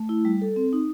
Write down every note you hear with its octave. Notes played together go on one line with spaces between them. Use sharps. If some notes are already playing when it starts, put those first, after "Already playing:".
Already playing: A3
E4
G3
A4
C4
D#4